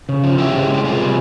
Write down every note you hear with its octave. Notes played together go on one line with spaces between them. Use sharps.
C#3
F3
C#3 E4 G4
G#3
C#3 G4
C3 F4 G#4
G3